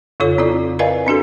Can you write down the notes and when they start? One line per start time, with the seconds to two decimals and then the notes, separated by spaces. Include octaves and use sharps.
0.20 F2 C#3 F4 A4 C#5
0.38 C4 E4 F4 A4 D5
0.79 A#4 B4 D5 D#5 F5 G#5
1.07 C4 D4 F#4 A4